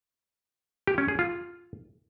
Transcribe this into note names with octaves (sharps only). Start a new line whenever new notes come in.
G4
C#4
G#4
F4